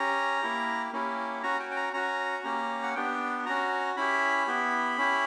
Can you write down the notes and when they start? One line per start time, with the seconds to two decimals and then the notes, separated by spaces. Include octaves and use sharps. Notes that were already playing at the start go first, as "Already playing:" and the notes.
Already playing: C#4 G4 A#5
0.41 A#3 E4 G4
0.92 A#3 C#4 E4 G4
1.43 C#4 F#4 A#5
1.60 G5
1.71 G5
1.77 A#5
1.93 C#4 F#4 A#5
2.44 A#3 C#4 G4 A#5
2.83 F#5
2.95 B3 D4 G4 G5
3.45 C#4 F#4 A#5
3.96 C#4 E4 G4 B5
4.47 B3 E4 G4
4.97 C#4 E4 G4